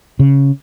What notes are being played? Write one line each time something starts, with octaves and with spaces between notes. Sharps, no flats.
C#3